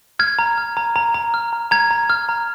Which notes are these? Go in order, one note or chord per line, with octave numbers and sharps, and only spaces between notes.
F6 G#6
A#5
F6
A#5
A#5
A#5
F6
A#5
A#5 G#6
A#5
F6
A#5